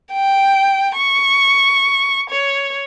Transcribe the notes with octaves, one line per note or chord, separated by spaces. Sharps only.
G5
C#6
C#5